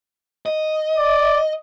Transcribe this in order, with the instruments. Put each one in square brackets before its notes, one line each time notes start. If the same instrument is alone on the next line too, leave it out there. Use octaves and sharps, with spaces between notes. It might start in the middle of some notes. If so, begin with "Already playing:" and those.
[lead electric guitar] D#5
[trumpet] D5